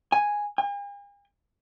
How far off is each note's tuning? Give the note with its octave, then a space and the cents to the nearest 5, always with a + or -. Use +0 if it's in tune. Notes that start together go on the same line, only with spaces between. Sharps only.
G#5 -5
G#5 -45